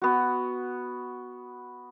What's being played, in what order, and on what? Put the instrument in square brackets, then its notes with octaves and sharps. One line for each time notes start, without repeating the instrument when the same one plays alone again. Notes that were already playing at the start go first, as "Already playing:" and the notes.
[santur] B3 F#4